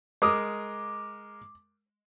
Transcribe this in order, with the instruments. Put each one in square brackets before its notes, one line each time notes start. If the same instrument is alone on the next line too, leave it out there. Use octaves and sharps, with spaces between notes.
[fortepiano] G#3 A#4 D#6 [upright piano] D6